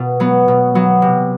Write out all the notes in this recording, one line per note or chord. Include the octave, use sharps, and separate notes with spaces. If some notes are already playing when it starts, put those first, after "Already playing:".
Already playing: B2
F#3 B3
B2
F#3 B3
C3